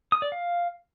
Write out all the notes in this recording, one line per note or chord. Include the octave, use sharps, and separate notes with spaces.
D#6
D5
F5